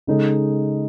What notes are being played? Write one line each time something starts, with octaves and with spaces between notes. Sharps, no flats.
C#3 G#3 D#4 A4